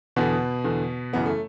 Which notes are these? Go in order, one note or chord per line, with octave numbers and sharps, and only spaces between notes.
E2 B2 D3 B3
E2 D3
F#2 C#3 E3 B3
A3